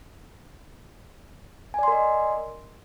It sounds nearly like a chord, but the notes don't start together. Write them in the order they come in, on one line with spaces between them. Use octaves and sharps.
G#5 D5 C6 A#4 D#5